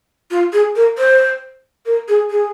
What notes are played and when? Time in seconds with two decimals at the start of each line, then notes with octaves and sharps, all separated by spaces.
0.31 F4
0.53 G#4
0.76 A#4
0.98 C5
1.86 A#4
2.08 G#4
2.30 G#4